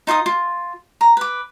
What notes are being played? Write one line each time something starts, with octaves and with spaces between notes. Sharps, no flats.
D#4 F4 F#5 D#6
F4
A#5
B4 D6